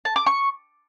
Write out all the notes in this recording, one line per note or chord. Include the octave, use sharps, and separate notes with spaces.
A5
D6
C#6